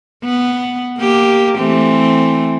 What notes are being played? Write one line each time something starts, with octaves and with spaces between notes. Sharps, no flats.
B3
A#3 G4
E3 A3 C4